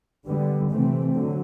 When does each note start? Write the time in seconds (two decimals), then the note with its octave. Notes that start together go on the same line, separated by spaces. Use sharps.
0.26 D3 G3 B3
0.70 C3 E3 A3 C4
1.13 D3 F#3